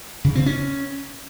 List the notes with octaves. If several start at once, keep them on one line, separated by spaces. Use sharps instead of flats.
C#3
C4
C#4